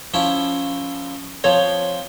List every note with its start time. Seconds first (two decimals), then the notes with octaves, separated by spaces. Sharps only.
0.14 F3 C#4 E4
1.44 F3 C4 C#5